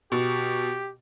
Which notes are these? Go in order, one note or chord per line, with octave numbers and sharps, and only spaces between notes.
B2 G4